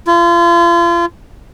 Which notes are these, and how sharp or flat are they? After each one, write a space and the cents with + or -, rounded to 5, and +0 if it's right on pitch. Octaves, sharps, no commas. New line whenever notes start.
F4 -35